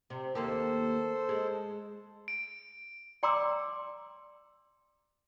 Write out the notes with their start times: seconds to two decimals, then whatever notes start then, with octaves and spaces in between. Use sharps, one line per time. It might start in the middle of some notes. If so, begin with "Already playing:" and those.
0.10 C3
0.35 D#2 A#3 G4 A4 C5
1.29 G#3
2.28 D7
3.23 D5 G5 A#5 C6 D6 E6